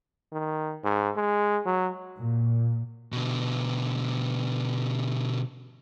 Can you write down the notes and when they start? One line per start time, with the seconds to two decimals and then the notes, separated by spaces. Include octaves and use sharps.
0.32 D#3
0.84 G#2
1.16 G#3
1.66 F#3
2.18 A#2
3.12 B2 D3